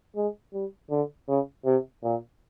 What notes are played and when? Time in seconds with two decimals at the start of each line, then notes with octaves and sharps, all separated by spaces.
0.16 G#3
0.54 G3
0.91 D3
1.28 C#3
1.65 C3
2.04 A#2